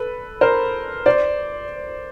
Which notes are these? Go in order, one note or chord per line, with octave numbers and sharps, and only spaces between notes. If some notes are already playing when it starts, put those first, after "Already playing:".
Already playing: A4 B4
A#4 C5
C5 D5